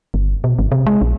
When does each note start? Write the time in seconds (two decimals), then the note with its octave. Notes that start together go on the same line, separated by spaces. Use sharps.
0.14 G1
0.44 B2
0.59 G#1
0.72 C3
0.87 G#3
1.01 A#1